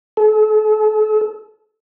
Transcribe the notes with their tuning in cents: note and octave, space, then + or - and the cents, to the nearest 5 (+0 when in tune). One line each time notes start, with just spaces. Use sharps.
A4 -40